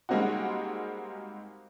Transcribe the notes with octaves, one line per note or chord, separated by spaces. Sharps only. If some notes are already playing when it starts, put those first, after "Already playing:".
G3 G#3 A#3 C4 D#4 F#4